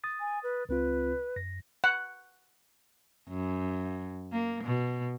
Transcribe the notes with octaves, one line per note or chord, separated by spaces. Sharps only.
D#6 A6
G#5
B4
C#2 C4 F4 B4
F#2 A#6
F#5
F#2
A#3
B2